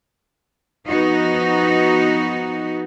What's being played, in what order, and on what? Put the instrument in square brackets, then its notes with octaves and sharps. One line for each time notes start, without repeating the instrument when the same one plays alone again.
[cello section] F3 B3 D#4 F#4